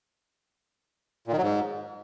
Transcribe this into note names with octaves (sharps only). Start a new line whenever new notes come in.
A#2
D#3
F#3
G#2